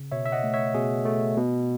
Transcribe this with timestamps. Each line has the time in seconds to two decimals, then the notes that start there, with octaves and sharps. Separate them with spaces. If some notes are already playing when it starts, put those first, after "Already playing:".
Already playing: C#3
0.12 B2 C#5 E5
0.26 E5
0.32 D#5 F#5
0.44 A3
0.54 C#5 E5
0.74 B2 G#4
1.05 A3
1.37 B2